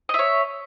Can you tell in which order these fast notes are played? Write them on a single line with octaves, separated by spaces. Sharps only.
D#5 E5 C#5